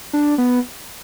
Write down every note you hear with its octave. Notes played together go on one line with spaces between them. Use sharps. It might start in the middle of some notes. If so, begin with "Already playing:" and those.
D4
B3